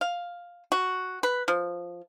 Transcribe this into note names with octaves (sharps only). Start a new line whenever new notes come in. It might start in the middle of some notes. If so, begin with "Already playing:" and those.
F5
F#4
B4
F3